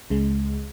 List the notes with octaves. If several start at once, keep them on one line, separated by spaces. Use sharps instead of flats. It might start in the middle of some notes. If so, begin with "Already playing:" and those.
C#2 C#3 G#3